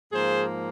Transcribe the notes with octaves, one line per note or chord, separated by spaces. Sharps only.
G#2 F3 A#3 G#4 C5